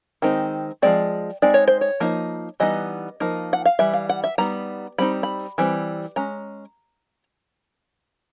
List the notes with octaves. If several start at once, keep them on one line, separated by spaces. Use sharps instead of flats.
D#3 G#3 C4 D#4
F3 G#3 C4 D5
G#3 C4 D#4 D5
C#5
C5
C#5
F3 A#3 D#4
E3 G3 B3 D#4 D#5
F3 A#3 D#4
F#5
F5
E3 G3 E5
F5
F#5
E5
G3 B3 D#4 A#5
G3 C4 D#4 B5
B5
E3 G3 C4
G#3 C#4 A#5